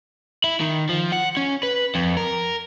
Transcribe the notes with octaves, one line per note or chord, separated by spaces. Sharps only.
E4
D#3
F3
F#5
C#4
B4
F2
A#4